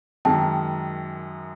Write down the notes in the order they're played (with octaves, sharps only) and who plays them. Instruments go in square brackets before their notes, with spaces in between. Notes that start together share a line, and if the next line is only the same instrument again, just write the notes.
[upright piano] F#2 D#3 G#3 [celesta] G5 A5